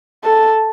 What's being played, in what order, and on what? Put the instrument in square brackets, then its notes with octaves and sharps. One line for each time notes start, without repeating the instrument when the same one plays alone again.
[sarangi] A4